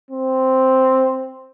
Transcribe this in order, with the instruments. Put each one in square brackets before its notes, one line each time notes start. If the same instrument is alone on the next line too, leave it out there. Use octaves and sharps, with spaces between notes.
[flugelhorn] C4